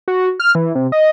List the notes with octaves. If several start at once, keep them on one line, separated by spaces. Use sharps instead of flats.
F#4
F6
E3
C3
D#5